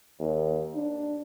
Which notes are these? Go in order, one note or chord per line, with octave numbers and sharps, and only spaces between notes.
D#2
D4